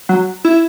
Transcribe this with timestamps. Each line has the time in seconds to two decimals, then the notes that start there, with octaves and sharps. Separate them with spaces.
0.09 F#3
0.45 E4